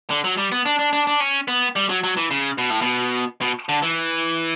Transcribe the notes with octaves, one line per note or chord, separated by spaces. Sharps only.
D3
F#3
G3
B3
D4
D4
D4
D4
C#4
B3
G3
F#3
F#3
E3
C#3
B2
A2
B2
B2
D3
E3